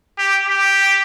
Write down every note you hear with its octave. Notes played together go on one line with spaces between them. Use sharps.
G4
G4